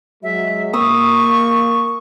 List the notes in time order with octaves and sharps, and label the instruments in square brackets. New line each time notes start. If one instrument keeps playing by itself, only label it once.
[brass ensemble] F#3 G#3 [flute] E5
[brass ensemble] A#3 [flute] C#6 [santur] D#6 E6